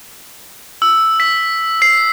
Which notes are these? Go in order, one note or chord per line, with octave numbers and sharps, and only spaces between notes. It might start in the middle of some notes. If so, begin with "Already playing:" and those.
E6
B6
C7